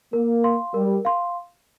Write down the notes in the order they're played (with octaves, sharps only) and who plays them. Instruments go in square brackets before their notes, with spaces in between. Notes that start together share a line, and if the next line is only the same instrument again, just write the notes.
[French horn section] A#3 [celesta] A#4
[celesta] F5 C6
[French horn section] G3 [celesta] A#4
[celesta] F5 C6